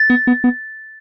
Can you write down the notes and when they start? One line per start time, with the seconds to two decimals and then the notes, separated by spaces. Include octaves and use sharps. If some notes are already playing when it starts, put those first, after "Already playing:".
Already playing: A6
0.10 B3
0.27 B3
0.44 B3